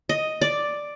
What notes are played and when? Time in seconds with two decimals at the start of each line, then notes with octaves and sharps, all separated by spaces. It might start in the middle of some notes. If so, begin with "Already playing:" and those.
0.09 D#5
0.41 D5